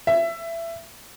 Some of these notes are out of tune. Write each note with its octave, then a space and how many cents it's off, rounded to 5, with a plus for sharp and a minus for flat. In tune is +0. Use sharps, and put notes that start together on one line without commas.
E5 +20